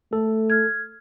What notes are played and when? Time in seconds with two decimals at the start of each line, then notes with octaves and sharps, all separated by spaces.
0.13 A3 A4
0.50 F6 G#6